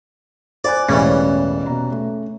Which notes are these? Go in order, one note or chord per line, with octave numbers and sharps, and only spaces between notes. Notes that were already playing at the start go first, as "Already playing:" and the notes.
C5 D5 G#5 F#6
E1 A1 C#3 E3 G3 C#4
B2 A#5
A3